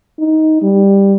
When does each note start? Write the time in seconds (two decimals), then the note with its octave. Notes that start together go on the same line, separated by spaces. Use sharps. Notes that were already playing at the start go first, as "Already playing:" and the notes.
0.19 D#4
0.62 G3